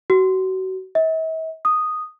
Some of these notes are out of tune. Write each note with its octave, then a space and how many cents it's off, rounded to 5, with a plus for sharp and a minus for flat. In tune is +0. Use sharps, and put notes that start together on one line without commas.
F#4 +30
E5 -45
D#6 -5